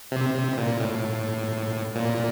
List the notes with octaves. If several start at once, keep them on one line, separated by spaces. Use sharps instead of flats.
C3
C3
A#2
A2
A#2